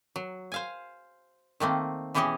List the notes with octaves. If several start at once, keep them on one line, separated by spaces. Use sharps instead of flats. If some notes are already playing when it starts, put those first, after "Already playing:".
F#3
C5 F5 G#5
D#3 A3 A#3 C4
B2 E3 C#4 G4 G#4 D#5